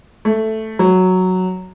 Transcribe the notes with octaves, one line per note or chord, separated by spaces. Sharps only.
A3
F#3